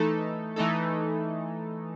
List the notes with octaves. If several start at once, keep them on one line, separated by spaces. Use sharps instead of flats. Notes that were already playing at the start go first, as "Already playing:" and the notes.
Already playing: E3 A3 D#4 A4
E3 A3 D#4 A4